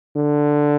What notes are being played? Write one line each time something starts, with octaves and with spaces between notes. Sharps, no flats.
D3